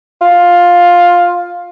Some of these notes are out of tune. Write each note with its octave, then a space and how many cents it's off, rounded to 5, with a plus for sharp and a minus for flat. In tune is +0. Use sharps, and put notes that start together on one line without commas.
F4 +10